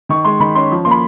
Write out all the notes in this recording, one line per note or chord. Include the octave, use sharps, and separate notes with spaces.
D#3 C#6
G#3 C6
D#3 B5
C#4 C6
F3
A#3 C6
B5